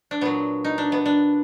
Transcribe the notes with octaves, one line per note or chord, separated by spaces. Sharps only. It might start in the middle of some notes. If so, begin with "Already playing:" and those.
D4
A#2 F#3 B3
D#4
D4
B3
D4